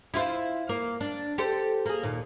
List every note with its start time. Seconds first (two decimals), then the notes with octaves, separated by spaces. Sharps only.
0.14 E4 F4 C5
0.69 A#3
1.01 D4
1.38 G4 A4 C5
1.86 A#3 G#4
2.03 D#2 A#2